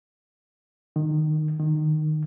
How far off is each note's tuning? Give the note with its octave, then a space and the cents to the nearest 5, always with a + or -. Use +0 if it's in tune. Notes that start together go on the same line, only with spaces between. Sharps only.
D#3 -20
D#3 -20